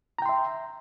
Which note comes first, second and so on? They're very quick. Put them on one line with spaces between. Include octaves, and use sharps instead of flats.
A#5 G5 C6 E5